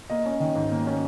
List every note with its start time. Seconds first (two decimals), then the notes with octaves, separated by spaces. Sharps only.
0.10 A#3 D#5
0.26 C#4
0.40 D#3
0.55 G#2
0.71 A#3
0.87 C#4